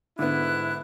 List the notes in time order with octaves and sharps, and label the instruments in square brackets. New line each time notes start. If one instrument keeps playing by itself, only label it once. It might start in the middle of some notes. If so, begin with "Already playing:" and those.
[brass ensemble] G#2 E4 [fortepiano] D3 B3 [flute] F#6